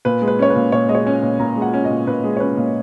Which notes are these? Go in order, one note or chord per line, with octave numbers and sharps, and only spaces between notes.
A#2 B4
G#3
B4
C#4 C#5
B4
A#2
A#2 C#5
G#3 D#5
C#5
C#4
A#2
A#2 A#5
G#3
F#5
C#4
D#5
A#2
A#2 B4
G#3
C#5
C#4 B4
A#2